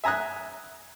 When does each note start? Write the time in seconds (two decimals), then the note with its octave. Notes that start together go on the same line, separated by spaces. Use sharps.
0.04 E5 G#5 A#5 D#6 F#6